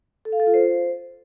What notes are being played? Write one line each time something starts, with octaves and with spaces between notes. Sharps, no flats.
A4
F5
A4
F4
C5